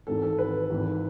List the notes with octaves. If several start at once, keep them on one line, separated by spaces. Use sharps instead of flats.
G#1 G#2 E3 A4
A4
B4
G#1 G#2 E3